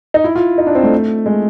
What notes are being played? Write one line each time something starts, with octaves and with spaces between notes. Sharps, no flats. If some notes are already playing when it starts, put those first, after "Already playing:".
D#4
E4
F4
D#4
D4
C4
A3
G#3